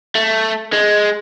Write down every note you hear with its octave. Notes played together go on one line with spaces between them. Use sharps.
A3
G#3